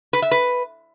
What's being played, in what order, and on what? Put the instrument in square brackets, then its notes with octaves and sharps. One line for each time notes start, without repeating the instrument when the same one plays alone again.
[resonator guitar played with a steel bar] B4
E5
B4